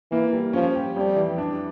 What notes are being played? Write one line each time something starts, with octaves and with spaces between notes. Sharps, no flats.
E3 A#3
G3
F3 C#4
G4
F2 G3
E3
D4